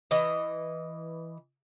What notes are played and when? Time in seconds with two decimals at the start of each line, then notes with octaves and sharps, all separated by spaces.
0.11 E3 D#5